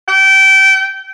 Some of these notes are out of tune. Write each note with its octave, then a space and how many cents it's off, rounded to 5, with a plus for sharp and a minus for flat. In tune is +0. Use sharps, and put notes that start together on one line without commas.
G5 -25